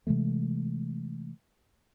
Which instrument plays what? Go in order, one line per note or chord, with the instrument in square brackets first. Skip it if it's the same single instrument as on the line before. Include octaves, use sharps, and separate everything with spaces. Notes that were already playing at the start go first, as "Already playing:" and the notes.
[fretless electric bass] C3 E3 G#3 A3